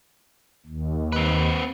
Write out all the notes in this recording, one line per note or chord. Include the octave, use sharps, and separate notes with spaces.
D#2
C4 B4